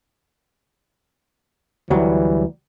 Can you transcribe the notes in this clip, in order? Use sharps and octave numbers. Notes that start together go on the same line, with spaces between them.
D2 E3 F#3 G3